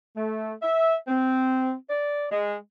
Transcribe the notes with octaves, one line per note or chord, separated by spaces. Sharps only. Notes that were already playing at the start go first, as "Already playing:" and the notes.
A3
E5
C4
D5
G#3